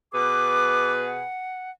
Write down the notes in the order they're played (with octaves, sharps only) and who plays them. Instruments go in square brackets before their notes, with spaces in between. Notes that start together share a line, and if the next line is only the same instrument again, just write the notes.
[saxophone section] B2 G#4 B4 [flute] D6
[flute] F#5